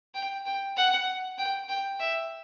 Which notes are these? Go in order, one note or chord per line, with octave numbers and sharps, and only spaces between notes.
G5
G5
F#5
G5
G5
E5